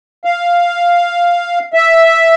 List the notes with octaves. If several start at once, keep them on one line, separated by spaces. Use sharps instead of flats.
F5
E5